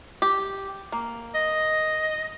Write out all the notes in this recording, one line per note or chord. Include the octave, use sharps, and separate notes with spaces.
G4
A#3
D#5